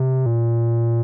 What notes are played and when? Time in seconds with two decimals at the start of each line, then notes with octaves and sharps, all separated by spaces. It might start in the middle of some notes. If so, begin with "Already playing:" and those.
Already playing: C3
0.26 A#2